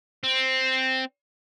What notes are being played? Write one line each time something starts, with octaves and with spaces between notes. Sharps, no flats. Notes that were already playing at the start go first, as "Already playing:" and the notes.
C4